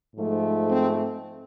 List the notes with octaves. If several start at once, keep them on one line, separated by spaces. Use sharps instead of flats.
G#2 F3 A3
C4